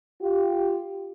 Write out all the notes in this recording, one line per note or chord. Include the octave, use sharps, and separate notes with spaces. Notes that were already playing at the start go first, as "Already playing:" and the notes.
F4 G4